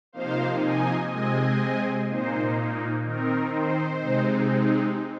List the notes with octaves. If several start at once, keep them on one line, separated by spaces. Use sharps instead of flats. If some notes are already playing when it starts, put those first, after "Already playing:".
C3 F3 A#3 D#4 C5 F5
D#5 G#5
C3 G#3 C4 D#5 G#5
A#2 A#3 D#4 C5
D#3 C4 D#4 A#4
C5
C3 G#3 C4 D#4